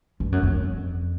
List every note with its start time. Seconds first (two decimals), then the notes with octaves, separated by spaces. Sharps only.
0.20 G2
0.32 F#2
0.43 F2